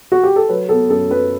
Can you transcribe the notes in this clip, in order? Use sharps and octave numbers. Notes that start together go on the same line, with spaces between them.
F#4
G4
A4
F#3 B4
B3 A4
F#2 A4
F#2 B4